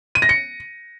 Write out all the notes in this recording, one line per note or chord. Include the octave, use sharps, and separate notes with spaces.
D#7
A#6
C#7